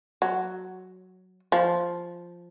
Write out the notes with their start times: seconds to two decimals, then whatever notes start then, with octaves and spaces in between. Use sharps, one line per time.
0.22 F#3
1.52 F3